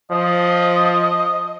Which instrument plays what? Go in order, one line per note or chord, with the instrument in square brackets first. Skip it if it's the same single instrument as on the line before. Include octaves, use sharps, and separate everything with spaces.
[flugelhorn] F3 [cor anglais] D#5